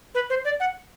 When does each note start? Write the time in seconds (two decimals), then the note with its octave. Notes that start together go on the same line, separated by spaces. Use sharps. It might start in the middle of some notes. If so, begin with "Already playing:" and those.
0.15 B4
0.30 C5
0.45 D5
0.60 F#5